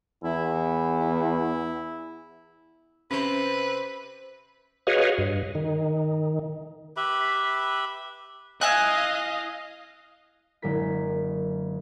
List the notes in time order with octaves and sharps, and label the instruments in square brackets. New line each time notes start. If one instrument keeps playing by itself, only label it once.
[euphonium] E2 [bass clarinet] E4
[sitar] C3 C5 [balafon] C#4 [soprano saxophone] B4
[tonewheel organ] F#4 G#4 B4 C#5 D#5 F5
G2
D#3
[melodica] G4 B4 E5 B5
[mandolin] E4 G#5 F#6 [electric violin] D#5 F5
[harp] F#1 D3 G#3 A#4 B6